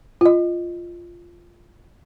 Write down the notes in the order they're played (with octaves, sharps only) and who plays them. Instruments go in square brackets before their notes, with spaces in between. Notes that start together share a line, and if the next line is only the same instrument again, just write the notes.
[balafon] F4 D#5